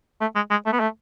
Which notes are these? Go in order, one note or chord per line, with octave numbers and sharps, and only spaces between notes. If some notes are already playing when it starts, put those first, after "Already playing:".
A3
G#3
G#3
A3
B3
A3